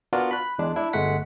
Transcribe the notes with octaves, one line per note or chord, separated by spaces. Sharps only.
B3 D4 F4 F#4 A#4
B5 F#6
E2 G#3 D4
D4 E4
G1 G#3 A3 F#5 B6